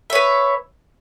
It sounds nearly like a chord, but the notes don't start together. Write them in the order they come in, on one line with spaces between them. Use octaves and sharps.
E5 C#5 B4